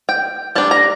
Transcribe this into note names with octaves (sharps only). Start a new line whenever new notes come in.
G5
G3 D4 A5
A#5